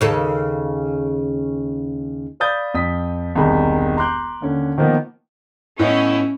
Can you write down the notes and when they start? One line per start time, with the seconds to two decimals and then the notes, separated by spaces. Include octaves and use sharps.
0.01 D#2 C#3 A4
2.40 D5 F5 B5 D#6 G6 A6
2.74 F2 D#6 B6
3.35 E1 C2 D#3 G#4 B5
3.97 A#5 C6 D6 F#6 G6
4.41 D#2 D3 C#4
4.78 D#3 F3 A#3 B3 B4
5.79 A2 B3 C#4 E4 D#5